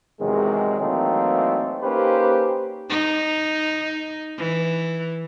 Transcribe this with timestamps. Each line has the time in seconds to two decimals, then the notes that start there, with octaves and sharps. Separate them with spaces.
0.21 E2 C3 D#3 F#3 G#3
0.80 E3 F#3 A3 A#3 C4 D#4
1.82 A#3 C#4 D#4 G4 B4 C5
2.89 D#4
4.38 E3